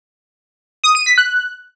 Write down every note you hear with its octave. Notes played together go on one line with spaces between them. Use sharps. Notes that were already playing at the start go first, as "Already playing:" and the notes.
D#6
D#7
B6
F#6